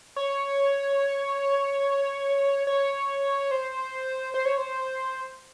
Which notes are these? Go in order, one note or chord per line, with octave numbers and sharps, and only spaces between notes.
C#5
C#5
C5
C5
C#5
C5